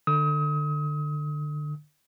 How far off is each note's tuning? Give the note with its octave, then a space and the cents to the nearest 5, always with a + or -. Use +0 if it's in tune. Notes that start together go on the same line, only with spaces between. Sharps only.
D3 +25 D#6 +35